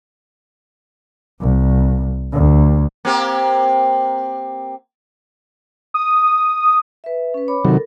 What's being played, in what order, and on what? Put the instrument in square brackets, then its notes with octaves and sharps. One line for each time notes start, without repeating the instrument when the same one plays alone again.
[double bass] C2
D2
[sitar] A#3 C4 G4
[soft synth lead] D#6
[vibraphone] B4 E5
C#4 B4
C#5 B5 D6
[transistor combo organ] C3 D#3 F#3 [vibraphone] A4 A#4